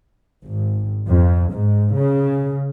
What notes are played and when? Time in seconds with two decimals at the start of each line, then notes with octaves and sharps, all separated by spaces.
0.43 G#1
1.10 F2
1.52 G#2
1.96 C#3